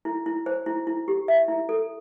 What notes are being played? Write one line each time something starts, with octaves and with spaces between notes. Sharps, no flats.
E4
E4
C5
E4
E4
G4
E5
E4
A4